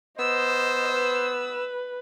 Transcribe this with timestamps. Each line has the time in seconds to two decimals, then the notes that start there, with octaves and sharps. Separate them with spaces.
0.19 B3 C5 D#5 E6
0.93 B4